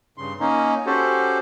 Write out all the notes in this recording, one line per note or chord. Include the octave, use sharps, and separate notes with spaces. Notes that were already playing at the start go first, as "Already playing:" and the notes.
G2 C#3 C6
A#3 C#4 D#4
C#4 F#4 G4 A4 C5